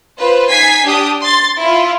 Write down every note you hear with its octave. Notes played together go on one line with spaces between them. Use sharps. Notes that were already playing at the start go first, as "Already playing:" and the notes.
F4 B4 C5
D#4 G#5 G#6 B6 C7
D4 G4 D#6
C6 A6
E4 F4